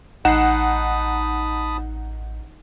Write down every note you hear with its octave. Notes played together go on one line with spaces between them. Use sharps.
A1 D#4 F#5 A5 B5 D#6 C7 E7